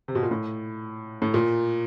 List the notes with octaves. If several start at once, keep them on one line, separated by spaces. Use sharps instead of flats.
C3
B2
A#2
A2
A2
A#2